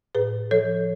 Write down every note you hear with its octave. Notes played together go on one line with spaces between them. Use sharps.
A2 G#4 B4
F3 A4 C#5